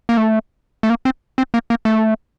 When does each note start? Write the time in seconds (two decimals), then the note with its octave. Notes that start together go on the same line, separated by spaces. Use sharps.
0.09 A#3
0.17 A3
0.83 A3
0.90 A#3
1.05 C4
1.38 C4
1.54 A#3
1.70 A#3
1.85 A3